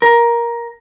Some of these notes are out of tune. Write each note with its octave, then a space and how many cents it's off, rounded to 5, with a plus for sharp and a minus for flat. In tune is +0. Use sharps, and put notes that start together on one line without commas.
A#4 +15